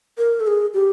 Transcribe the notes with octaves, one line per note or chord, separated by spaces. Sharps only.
A#4
A4
G#4
G4